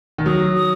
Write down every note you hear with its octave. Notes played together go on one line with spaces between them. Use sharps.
D#3
F#3 D#6
D#6